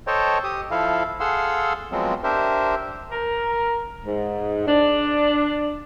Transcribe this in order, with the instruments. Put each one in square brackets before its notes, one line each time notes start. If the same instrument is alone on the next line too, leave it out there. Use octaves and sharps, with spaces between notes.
[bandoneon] A4 C5 C#5 D#5 G5 A5
G4 D#6
F3 E4 A4 F5
G#4 A4 F5 F#5 C6 E6
F3 F#3 G#3 B3 C4
D4 G4 A#4 C5 E5
[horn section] A#4
G#2
D4